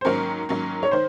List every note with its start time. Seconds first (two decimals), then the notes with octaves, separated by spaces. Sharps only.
0.01 C5
0.05 G#2 D#3 F#3 A#3 C#4 A#4
0.49 G#2 D#3 F#3 A#3 C#4
0.83 C#5
0.91 D#3 C5